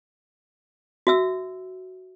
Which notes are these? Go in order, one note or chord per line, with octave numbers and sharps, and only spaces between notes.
F#4 E5 E6